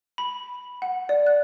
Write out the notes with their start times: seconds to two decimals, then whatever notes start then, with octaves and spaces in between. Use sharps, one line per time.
0.18 B5
0.82 F#5
1.09 D5
1.27 F#6